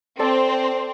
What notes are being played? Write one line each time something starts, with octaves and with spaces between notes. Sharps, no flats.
C4 A4 D5 A5